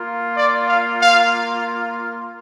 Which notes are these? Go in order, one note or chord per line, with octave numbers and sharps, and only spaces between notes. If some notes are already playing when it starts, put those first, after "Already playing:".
Already playing: A#3 F4
D5
F5
F5